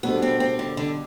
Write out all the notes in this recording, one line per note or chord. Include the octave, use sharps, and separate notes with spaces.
B2 G3 B3 D4 A4 C5
C4
C4
D3
D3